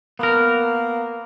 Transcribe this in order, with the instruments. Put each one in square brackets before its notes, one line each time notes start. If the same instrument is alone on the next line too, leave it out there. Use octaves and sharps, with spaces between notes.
[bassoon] A#3 [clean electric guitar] B3 A#4